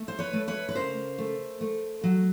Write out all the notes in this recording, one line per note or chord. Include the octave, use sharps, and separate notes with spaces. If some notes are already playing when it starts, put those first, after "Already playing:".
Already playing: A3
C5
B4 C#5
A3
B4 C#5
B4
C#3 A#4 C5
A3
A3
F#3